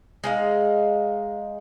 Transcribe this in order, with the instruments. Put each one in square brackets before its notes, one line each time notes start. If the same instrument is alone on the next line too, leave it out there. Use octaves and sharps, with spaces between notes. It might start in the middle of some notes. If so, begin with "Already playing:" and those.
[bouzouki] G#3 D#4 F5